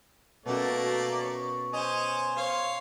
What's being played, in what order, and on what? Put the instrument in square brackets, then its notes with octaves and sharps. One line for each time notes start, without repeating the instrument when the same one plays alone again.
[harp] B2 C#4 F#4 [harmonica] A3 A#3 D5
[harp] C#5 C#6
[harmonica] C#4 C5 [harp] D#5 G#5
[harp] C5 [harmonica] C#5 F5